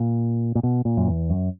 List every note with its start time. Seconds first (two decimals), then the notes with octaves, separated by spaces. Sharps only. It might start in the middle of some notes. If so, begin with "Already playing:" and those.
Already playing: A#2
0.55 A#2
0.63 B2
0.85 A#2
0.97 F#2
1.08 E2
1.30 F#2